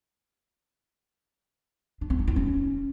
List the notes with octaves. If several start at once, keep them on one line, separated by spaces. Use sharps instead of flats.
D4
C4
D#4
E4
C#4